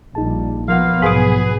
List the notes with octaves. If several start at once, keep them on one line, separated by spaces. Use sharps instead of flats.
A#1 G3 D#4 G#4 A5
B1 F3 A#3 B3 F4 F5 F#5
G#2 B2 G#4 B4